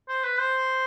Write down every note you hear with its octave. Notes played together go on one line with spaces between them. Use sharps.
C5
B4
C5